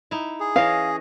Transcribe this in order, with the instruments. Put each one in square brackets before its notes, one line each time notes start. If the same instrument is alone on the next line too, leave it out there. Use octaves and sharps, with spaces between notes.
[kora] D#4 E4
[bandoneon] G#4
[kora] E3 C#4 D#5 [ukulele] F5